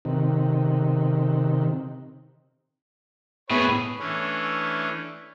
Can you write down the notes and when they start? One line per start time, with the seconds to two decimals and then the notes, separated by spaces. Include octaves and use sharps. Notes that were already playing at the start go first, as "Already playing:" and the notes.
0.05 C3 D#3
3.50 A2 B3 G#4 B4 C#5
3.99 E3 A3 C#4 D4